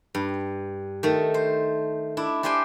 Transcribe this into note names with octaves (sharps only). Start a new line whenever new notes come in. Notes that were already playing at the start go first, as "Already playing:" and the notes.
G2
D#3 A3
C5
D4 E4
D4 G4 C5 G5 G#5